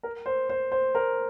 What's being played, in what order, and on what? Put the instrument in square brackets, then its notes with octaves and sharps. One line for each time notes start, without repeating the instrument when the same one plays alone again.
[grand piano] A#4
C5
C5
C5
A#4